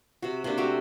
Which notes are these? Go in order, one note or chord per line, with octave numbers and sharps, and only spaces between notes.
C3 F#4
C3 A#3 D4
A3 F#4 G4